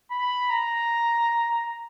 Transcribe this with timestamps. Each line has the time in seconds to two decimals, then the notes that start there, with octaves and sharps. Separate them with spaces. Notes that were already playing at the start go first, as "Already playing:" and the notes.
0.11 B5
0.50 A#5